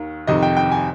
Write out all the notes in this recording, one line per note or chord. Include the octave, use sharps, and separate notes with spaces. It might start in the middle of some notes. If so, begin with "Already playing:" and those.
Already playing: D#2 D#3
F2 C3 D#3 D#5
G5
G5
G#5